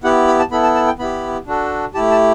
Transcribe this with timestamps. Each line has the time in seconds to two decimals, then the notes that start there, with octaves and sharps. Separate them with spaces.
0.04 B3 E4 G4 F#5
0.28 B5
0.39 A5
0.51 B3 E4 A4 B5
0.63 A5
0.75 A5
0.87 G5
0.99 B3 E4 G4 B5
1.47 D4 F#4 A4
1.94 A3 E4 G4 A5
2.11 A5